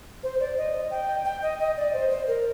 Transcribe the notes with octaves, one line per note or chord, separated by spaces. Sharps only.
C5
D5
D#5
G5
G5
D#5
D#5
D5
C5
C5
A#4